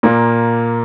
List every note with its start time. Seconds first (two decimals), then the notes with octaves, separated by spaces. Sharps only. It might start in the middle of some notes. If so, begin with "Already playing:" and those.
0.03 A#2 A#3